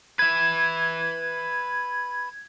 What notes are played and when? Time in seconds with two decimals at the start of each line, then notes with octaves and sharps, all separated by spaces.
0.19 B4 E5 G#6